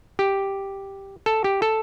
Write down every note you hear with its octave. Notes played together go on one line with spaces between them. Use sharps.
G4
A4
G4
A4